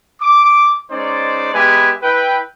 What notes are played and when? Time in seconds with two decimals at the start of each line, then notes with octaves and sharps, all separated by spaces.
0.21 D6
0.90 G#3 C#4 D#4 C5 D5
1.53 G#3 B3 G4 B4 E5 G#5
2.02 E4 B4 G5